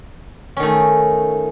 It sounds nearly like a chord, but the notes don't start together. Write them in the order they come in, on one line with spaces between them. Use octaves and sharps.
C#4 D#3 A3